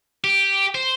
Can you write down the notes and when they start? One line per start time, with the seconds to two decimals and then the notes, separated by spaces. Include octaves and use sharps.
0.24 G4
0.75 C5